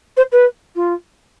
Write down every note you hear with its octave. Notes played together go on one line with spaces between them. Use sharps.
C5
B4
F4